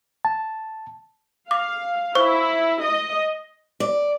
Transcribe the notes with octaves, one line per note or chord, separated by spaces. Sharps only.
A5
F5 D6
E4 C5 C#6 G7
D#5
D5